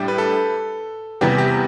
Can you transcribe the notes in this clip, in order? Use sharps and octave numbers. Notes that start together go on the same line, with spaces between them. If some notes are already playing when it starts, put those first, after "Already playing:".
Already playing: A2 G3 D4 G4
B4
A4
E2 C3 E3 G3 B3 G4
G4